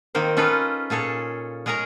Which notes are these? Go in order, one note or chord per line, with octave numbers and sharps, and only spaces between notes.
D#3 A#3 C4 C5
C#4 D#4 F4 A4 B4
A#2 G#4 A4 C#5
G#3 G#4 A#4 C#5 A#5